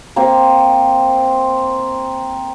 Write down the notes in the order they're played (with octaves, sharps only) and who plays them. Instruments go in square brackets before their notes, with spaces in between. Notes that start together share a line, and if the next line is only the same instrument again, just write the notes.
[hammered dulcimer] A#3 C4 C5